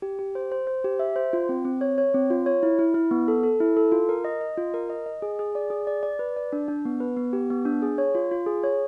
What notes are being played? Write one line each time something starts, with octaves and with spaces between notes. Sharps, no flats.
G4
G4
C5
C5
C5
G4
E5
C5
F4
C4
C4
C#5
C#5
C4
F4
C#5
E4
E4
E4
B3
A4
A4
E4
A4
F4
A#4
D#5
D#5
F4
A#4
D#5
D#5
G#4
G#4
D5
G#4
D5
D5
B4
D5
D4
D4
B3
B4
B3
G4
B3
D4
G#4
C#5
F4
F4
G#4
C#5